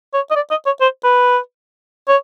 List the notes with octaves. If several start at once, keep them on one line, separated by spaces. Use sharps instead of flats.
C#5
D#5
D5
D#5
C#5
C5
B4
C#5